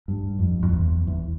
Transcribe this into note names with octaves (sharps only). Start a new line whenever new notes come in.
G2
F2
F2
E2
E2